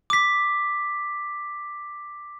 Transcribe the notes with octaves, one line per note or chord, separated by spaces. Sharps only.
D6 B6